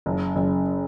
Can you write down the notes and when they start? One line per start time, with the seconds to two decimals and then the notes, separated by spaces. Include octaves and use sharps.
0.06 F#1
0.36 F#1